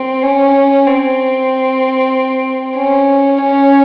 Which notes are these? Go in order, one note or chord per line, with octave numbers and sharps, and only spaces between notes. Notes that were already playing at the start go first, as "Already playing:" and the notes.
Already playing: C4
C#4
C4
C#4
C#4